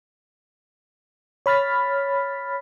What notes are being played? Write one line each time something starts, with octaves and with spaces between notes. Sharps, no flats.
C#5 B5 F6 A6 B6